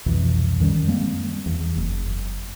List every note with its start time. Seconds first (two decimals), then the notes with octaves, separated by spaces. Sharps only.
0.06 C2 F2 B2 E3
0.60 F#2 D#3 G3 C#4
0.88 G3 G#3 A#3 C4
1.46 E2
1.76 F#1